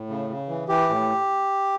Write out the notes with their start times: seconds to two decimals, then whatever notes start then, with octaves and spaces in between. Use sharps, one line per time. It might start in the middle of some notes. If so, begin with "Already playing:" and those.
Already playing: A2
0.10 C#3
0.30 C#3
0.49 E3
0.68 E3 G4
0.89 A2